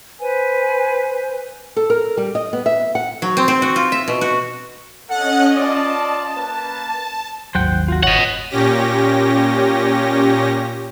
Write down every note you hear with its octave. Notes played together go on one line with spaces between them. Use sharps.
B4 C5 G#5
A4
A#4
G3
D#5
B3
E5
F#5
F#3
C4
C4
F#4
F4
E5
B2
F#4
C#4 A4 D#5 F#5
F4 D5 D#5 A5
A#3 B4
G#1 D#2 F#3 C5 F#5 G5
F4 F#4
G1 C#5 D#5 F#5
A#2 C#4 G4 A#6